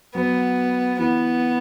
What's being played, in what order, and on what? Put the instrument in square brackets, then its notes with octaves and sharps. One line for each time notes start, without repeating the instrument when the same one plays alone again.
[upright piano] F#3 [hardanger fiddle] B3
[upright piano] E3 [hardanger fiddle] B3